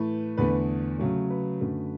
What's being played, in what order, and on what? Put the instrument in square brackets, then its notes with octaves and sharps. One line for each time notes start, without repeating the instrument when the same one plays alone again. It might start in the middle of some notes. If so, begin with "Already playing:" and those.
Already playing: [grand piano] A2 E3 A3 B4
E2 D3 A3 B4
C#3 F#3 A3
B4
F#2 D3 A3